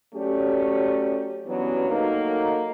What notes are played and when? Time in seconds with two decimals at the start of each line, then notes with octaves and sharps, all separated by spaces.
0.14 F#3 A3 C#4 G4 D5
1.46 G2 E3 F#3 B3 C#4
1.89 F#3 A3 A#3 D#4